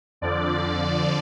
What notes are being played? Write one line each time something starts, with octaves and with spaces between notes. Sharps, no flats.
F2 D3 F3 D5